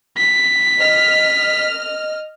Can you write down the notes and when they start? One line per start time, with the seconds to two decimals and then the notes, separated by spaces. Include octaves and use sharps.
0.18 B6
0.79 D#5 F6